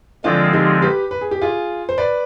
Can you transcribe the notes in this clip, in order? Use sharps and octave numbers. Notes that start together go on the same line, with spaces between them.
D3 F3 G#3 C4 D4 F4
D#4 G4
G4 B4
B4
G#4
G4
F4 G#4
C5
B4 D5